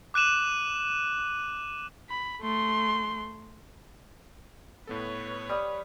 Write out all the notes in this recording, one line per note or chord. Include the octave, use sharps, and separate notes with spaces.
D6 F#6 D#7 E7 F#7
B5
A3 C6
A2 B3 A4 B4 C#5
G3 D#6